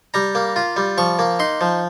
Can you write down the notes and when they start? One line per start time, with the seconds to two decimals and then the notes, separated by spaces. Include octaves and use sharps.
0.14 G3 A#5
0.35 A#3
0.56 F4
0.77 G3
0.98 F3 C#6
1.19 A#3
1.39 D#4 C6
1.61 F3